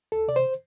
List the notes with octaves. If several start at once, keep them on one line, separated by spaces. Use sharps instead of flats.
D2 A4
C3 D5
C5